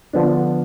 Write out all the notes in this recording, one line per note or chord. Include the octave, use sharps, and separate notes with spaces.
D3 F3 B3 D4